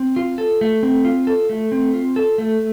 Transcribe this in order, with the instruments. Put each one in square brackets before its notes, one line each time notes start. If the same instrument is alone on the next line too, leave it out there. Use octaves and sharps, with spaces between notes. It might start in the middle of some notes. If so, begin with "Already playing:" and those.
Already playing: [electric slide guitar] C4
F4
A4
A3
C4
F4
A4
A3
C4
F4
A4
A3